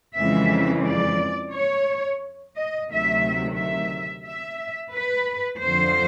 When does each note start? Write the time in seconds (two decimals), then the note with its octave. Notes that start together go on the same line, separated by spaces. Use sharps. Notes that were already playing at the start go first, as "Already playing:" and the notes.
0.16 F2 C#3 E3 G#3 E5
0.85 D5
1.54 C#5
2.56 D#5
2.89 D2 C3 D#3 F#3 A3 E5
3.57 E5
4.26 E5
4.93 B4
5.62 F2 D3 F3 C5